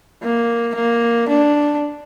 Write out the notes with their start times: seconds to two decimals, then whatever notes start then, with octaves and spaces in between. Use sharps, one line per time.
0.23 A#3
0.75 A#3
1.28 D4